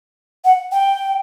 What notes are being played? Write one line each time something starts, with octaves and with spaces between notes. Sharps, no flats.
F#5
G5